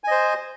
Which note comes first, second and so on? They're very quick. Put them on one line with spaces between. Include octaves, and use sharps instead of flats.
G#5 D#5 C5